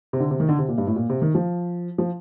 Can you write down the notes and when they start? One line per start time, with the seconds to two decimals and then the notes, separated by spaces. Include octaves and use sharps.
0.13 C3
0.20 D3
0.31 C3
0.40 D#3
0.49 D3
0.58 C3
0.68 A#2
0.78 G2
0.87 A2
0.96 A#2
1.09 C3
1.22 D#3
1.35 F3
1.98 F3